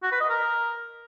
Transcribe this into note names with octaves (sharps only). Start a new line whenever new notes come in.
F#4
B4
D#5
A#4